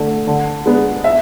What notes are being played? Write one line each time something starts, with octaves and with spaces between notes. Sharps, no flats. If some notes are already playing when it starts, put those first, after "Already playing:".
Already playing: D3 A3 D4
D3
G#3 B3 D4
E5